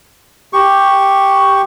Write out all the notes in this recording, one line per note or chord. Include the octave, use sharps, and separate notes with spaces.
G4 C#6